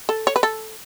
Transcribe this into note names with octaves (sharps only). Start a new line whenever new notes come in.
A4
C#5
B4
A4